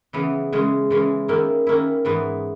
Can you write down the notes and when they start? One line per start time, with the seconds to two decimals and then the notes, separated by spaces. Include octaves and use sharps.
0.13 C#3 E3 B3
0.53 C#3 E3 G#3 C#4
0.90 C#3 E3 G#3 C#4
1.28 D#3 A#3 C#4 E4
1.67 D#3 A#3 C#4 E4
2.05 G#2 E3 B3